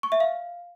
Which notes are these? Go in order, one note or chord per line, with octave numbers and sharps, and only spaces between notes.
C#6
E5
F5